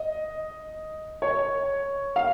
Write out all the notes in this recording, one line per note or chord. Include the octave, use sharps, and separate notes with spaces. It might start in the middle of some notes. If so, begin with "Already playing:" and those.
Already playing: D#5
C#5
F5